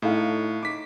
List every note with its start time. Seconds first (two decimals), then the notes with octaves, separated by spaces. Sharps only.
0.02 A2 D#4 A4 F5
0.63 D#4 D6 B6